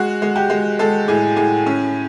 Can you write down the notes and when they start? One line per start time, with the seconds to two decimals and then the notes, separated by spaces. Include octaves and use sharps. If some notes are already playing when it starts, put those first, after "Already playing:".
Already playing: G#3 F#4
0.22 G#3
0.36 G4
0.50 G#3
0.79 G#3 A4
1.08 A2 G#4
1.36 A2 G#4
1.66 C#4